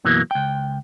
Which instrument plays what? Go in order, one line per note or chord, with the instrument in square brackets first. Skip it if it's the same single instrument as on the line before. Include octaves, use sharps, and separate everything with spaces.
[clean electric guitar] F#2 B2 E3 F#3 A#3
C#2 G5